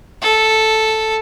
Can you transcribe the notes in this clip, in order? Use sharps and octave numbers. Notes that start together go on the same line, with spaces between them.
A4